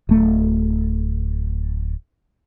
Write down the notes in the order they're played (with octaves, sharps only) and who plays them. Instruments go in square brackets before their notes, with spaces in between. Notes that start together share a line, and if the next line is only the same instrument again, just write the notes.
[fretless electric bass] D1 A3